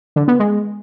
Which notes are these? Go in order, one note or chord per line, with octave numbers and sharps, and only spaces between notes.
D3
B3
G#3